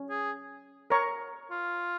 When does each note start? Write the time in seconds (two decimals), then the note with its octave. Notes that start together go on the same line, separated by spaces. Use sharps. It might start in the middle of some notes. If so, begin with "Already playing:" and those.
Already playing: C#4
0.10 G#4
0.90 A#4 C#5 A#5 C#6
1.51 F4